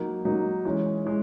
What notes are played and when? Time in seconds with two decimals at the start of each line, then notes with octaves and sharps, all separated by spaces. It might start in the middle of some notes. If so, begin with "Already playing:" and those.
Already playing: F#3 A#3 D#4
0.25 F#3 A#3 D#4
0.65 E3 G#3 C#4
1.05 E3 G#3